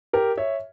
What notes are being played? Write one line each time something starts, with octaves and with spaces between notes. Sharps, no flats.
G4 A#4
C#5 E5